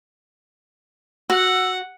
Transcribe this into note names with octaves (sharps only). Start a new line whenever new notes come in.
F#4 F#5 E6